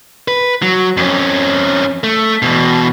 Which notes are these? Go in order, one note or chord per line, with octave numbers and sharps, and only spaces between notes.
B4
F#3
F2 C#4
A3
E2 B2